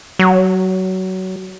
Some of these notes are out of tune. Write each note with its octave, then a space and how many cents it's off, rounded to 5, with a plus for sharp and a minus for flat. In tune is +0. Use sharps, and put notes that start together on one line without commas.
F#3 +20